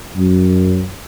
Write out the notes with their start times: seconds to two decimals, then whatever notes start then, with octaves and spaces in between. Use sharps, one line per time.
0.15 F#2